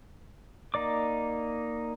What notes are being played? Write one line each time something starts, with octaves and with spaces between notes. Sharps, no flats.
A#3 D#4 D5 D6